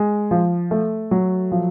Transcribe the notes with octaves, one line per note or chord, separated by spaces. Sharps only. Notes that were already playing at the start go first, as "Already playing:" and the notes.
Already playing: G#3
F3
A3
F#3
F3